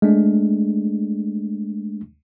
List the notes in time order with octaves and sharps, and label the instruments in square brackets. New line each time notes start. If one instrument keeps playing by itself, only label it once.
[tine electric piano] G#3 A3 D4